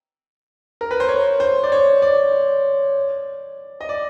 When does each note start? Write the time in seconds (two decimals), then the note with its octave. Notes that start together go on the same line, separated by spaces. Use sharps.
0.81 A#4
0.91 B4
1.00 C5
1.09 C#5
1.40 C5
1.63 D5
1.72 C#5
2.02 D5
3.81 D#5
3.89 D5